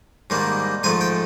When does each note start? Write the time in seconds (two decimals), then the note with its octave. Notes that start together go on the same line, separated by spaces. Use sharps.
0.30 G#2 D#3 G3 A#3
0.83 G#2 F3 A3 G#5
1.01 G5